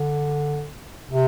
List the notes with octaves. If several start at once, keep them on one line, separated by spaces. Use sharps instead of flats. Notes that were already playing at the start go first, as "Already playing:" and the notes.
Already playing: D3
C3